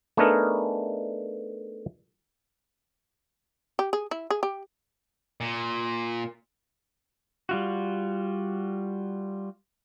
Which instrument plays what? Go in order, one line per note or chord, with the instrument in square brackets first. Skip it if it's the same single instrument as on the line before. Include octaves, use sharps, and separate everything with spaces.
[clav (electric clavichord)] A3 B3 D4 D#4 G#4 A#4
[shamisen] G4
G#4
E4
G#4
G4
[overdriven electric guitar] A#2
[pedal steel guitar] G3 F4 F#4